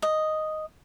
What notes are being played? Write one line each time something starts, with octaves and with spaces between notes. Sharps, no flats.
D#5